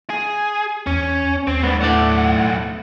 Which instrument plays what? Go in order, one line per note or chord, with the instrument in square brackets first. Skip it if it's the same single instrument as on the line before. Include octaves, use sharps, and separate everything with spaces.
[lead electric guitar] G#4
[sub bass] E2 [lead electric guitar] C#4
[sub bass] D#2 [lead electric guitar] C4
[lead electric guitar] G#2 D4 [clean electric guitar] B3
[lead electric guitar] B1 F#5 [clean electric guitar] A2 A3 D5